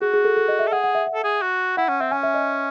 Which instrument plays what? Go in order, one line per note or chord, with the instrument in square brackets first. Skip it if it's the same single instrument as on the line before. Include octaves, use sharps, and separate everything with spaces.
[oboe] F#4 [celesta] G#4
[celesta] G#4
A4
A4
D#5
E5
[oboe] A4
[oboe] G#4 [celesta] F#5
[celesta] F#5
E5
E5
[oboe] A4
G#4
F#4
[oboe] E4 [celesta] F#5
[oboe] C#4 [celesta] F#5
[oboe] C4 [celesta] E5
[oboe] C#4 [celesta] G#5
[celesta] E5
D#5